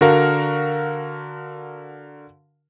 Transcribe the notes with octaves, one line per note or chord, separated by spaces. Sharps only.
D3 F#4 A#4 F5